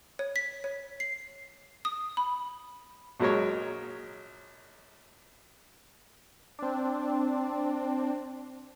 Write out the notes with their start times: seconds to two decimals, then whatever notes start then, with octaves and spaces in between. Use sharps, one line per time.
0.19 C#5
0.36 B6
0.64 C#5
1.00 C7
1.85 D#6
2.17 B5
3.20 A#1 F#3 G#3 A#4 C#5
6.59 C4 D4